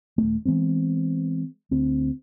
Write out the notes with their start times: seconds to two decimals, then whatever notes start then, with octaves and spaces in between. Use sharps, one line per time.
0.18 D#1 A3
0.45 E3 G#3 B3 C4
1.71 D2 C4